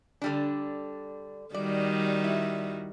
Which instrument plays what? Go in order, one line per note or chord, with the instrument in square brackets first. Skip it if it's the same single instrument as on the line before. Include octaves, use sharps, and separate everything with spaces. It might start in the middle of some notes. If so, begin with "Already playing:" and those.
[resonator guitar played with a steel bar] D3 G3 D4
[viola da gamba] D#3 G3 F#4 [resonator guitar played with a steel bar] D5
[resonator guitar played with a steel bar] E4